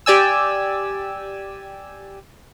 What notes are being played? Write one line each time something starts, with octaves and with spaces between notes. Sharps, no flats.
G4 D5 G#5 E6